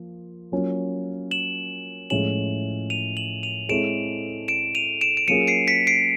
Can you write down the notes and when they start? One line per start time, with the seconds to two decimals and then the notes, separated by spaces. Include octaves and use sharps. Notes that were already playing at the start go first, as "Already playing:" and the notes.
Already playing: F3 A#3
0.52 F#3 A#3 C#4 F4
1.31 E7 F#7
2.10 A2 F3 G#3 C#4 E4 E7 F#7
2.90 D#7 F7
3.17 E7 F#7
3.43 D#7 F7
3.69 G#3 C4 E4 A4 C#5 D7 E7
4.48 D7 E7
4.75 D#7 F7
5.01 D7 E7
5.17 D7
5.28 F#3 A#3 C#4 F4 G#4 C#7 D#7
5.47 C7 D7
5.67 B6 C#7
5.87 C7 D7